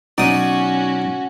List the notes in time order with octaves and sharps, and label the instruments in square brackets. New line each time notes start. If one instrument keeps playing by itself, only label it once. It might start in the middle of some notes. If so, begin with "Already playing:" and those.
[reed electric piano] B2 F#3 D#4 [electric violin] C#4 F#4 [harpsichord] D5 D#6 [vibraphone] F#5